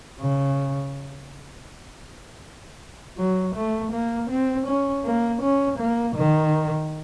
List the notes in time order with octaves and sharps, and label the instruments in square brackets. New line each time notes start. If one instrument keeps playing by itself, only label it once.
[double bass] C#3
F#3
A3
A#3
C4
C#4
A#3
C#4
A#3
D#3